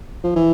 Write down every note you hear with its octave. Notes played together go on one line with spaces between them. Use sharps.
F3
E3